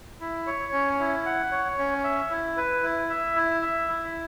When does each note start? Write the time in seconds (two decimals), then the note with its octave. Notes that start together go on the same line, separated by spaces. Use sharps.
0.21 E4
0.47 C#5
0.73 C#4
0.99 E4
1.26 F#5
1.51 C#5
1.78 C#4
2.04 E5
2.30 E4
2.57 B4
2.83 E4
3.10 E5
3.36 E4
3.62 E5
3.88 E4